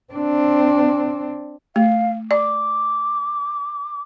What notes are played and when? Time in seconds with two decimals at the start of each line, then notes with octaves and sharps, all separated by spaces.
0.13 C4 D4
1.76 A3 F5
2.31 D5 D6